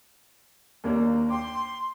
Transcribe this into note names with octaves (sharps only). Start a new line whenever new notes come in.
D#2 A#3 D4
G5 C6 D6